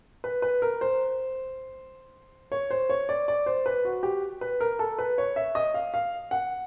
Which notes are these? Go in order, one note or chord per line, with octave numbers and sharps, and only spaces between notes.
B4
B4
A#4
C5
C#5
C5
C#5
D5
D5
C5
B4
F#4
G4
B4
A#4
A4
B4
C#5
E5
D#5
F5
F5
F#5